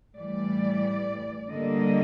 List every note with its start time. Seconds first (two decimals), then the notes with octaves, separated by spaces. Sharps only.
0.17 A2 E3 G3 D5
1.53 D3 G3 A#3 D#5